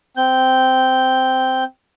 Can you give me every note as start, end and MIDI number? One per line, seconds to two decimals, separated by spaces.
0.17 1.64 60
0.17 1.64 91